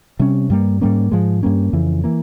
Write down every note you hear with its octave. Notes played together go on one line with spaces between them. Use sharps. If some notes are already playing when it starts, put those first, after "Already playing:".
C3 G3 C#4
G2 G3 A#3
G#2 G3 A#3 C#4
G#2 F3 G#3
G2 G3 A#3 C#4
F2 C#3 E3
E3 A#3